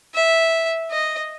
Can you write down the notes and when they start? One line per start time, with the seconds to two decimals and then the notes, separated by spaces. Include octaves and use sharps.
0.15 E5
0.91 D#5